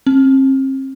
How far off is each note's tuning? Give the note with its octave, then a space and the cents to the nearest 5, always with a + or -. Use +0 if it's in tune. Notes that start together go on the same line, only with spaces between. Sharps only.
C4 +40